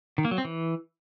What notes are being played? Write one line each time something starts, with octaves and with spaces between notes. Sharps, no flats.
D#3
A#3
F#3
C4
E3